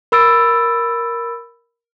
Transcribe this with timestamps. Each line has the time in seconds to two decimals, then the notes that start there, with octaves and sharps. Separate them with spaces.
0.12 A#4 B5 E6 A6 D7